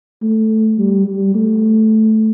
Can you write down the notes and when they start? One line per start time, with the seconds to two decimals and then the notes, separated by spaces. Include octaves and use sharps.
0.22 A3
0.78 G3
1.07 G3
1.35 A3